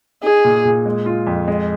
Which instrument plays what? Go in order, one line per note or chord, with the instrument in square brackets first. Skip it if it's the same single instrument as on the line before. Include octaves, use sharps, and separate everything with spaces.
[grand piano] D#4 [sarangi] G#4
[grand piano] A#2
A#2
G#3
F4
F2
G#3